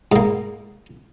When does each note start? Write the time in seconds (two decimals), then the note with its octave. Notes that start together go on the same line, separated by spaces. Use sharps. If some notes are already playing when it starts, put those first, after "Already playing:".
0.12 G#2 A#3